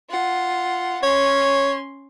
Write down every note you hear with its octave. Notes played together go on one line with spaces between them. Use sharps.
F4 F#5
C#4 C#5 C6